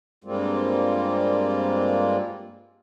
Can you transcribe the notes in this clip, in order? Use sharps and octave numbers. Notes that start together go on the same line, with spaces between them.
G2 G3 G#3 A#3 C4 F4